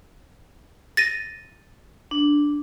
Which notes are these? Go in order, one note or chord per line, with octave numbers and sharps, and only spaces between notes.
A6 A#6 D#7
D4